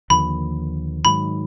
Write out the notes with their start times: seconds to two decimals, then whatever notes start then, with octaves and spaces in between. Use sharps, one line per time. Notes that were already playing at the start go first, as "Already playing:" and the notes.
0.10 D#2 D3 F3 A#3 B5
1.05 G#2 D#3 F#3 B5